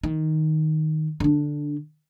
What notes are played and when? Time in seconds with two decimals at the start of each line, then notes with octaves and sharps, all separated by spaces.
0.03 D#3
1.20 D3 D4